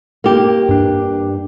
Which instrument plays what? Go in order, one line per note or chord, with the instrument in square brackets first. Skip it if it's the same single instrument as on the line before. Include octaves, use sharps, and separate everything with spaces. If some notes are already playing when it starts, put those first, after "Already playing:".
[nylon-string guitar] A#3 G4
[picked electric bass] G2 D4